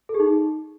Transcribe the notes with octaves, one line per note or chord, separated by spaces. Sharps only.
A4
G#4
D#4